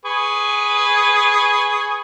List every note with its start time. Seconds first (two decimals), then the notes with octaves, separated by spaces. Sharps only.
0.05 G#4 B4 C#6